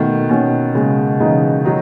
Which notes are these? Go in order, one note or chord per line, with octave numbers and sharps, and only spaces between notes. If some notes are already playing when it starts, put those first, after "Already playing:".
Already playing: B2 D#3 A3
B2 D#3 C#4
C#3 G#3
C#3 E3 D#4
D#3 F#3 D#4